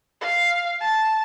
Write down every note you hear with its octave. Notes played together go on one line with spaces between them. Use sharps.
F5
A5